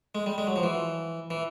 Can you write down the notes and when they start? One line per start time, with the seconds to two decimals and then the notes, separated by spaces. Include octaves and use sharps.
0.15 G#3
0.26 G3
0.38 G#3
0.47 F#3
0.56 F3
0.63 E3
1.30 E3